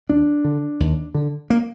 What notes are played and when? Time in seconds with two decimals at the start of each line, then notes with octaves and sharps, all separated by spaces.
0.09 D#2 D4
0.44 D3
0.80 D#2
1.14 D3
1.50 A#3